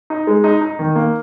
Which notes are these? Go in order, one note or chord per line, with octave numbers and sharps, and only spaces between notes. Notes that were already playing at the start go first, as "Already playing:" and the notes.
D#4
G#3
D#4
D#4
D#3
A#3